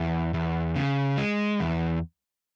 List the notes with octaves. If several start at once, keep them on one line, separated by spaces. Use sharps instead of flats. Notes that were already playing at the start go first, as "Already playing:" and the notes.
Already playing: E2
E2
C#3
G#3
E2